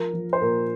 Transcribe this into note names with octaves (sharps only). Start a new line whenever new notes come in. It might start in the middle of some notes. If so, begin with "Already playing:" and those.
Already playing: F3 A#4
F3
C5
A#2 A#4